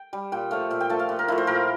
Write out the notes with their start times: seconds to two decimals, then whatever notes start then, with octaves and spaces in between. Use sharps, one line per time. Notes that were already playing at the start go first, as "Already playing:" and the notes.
Already playing: G5
0.13 G3
0.32 A#2 G5
0.51 F3 A3 F5
0.70 A#2 E5
0.80 G5
0.89 F3 A3 A5
0.99 F5
1.09 A#2
1.19 A#4
1.28 F3 A3 E4
1.38 C5
1.47 A#2 A#4